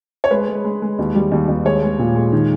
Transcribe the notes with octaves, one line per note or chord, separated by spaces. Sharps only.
C#5
G#3 B4
G#3
G#3
G#3
D#2
G3
D#2
D#2
G#3 C#5
G#3
A#2
G#3
D#3